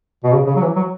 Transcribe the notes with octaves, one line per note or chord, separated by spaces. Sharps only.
B2
C#3
C#3
F#3
E3
F#3